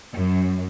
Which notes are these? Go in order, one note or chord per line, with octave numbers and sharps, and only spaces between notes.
F#2